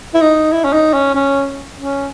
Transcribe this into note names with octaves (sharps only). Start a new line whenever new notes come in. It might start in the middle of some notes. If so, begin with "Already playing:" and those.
E4
D#4
E4
C#4
D#4
C#4
C#4
C#4